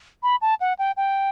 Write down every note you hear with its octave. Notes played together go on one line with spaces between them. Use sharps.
B5
A5
F#5
G5
G5